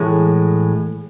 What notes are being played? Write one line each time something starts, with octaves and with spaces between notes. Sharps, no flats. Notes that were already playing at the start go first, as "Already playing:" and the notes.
Already playing: A2 E3 G#3